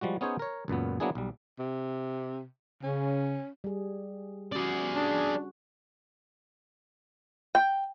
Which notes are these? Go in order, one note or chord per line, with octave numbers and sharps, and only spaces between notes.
F3 G3 G#3 F#4
B3 C#4 D#4 G#4 C5 C#5
A#4 C#5
C#2 F#2 A#2 B3
F#3 A#3 B3 D4 E4 G#4
B1 G3
C3
C#3 C#4
G3 G#4
C#4 F#4 G#4 D5
D4
G5